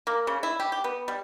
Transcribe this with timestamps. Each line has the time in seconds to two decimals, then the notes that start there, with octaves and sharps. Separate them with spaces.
0.07 A#3
0.27 C#3
0.43 E4
0.60 G4
0.72 G4
0.84 B3
1.08 G3